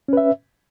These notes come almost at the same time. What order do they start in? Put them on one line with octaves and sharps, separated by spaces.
C#4 B4 E5